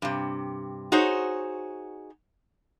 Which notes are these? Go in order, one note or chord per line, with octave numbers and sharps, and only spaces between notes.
G2 C3
D#4 F#4 G#4 C5 C#5